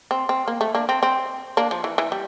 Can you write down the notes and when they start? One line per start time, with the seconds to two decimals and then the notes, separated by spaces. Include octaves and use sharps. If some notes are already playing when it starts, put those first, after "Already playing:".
0.11 C4
0.29 C4
0.48 A#3
0.61 A3
0.75 A#3 D4
0.89 C4
1.03 C4
1.57 A#3 D4
1.71 F3
1.84 E3
1.98 E3
2.12 G3